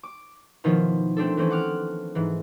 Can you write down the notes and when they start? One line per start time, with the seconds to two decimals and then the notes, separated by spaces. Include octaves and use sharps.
0.03 D6
0.64 B2 D#3 F3 E4 F4
1.17 A3 C4 D4 A4
1.37 E3 A3 C4 C#4
1.50 F#5 D6 F6
2.15 G#2 E3